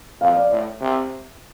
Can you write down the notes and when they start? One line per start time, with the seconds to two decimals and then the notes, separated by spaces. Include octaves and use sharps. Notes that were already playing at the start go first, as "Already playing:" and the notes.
0.21 F2 F5
0.36 D5
0.51 A2
0.81 C3